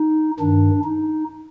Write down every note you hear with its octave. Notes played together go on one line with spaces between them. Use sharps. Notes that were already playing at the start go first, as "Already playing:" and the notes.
Already playing: D#4
G2 D#3 D4
D#4